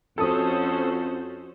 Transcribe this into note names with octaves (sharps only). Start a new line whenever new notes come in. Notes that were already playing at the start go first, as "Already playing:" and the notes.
F2 C#4 F#4 A4 C5 D#6